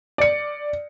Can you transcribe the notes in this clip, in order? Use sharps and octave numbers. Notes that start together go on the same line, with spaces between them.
D5 C#7